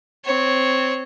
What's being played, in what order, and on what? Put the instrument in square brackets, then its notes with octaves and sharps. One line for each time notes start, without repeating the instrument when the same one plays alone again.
[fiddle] C4 C#5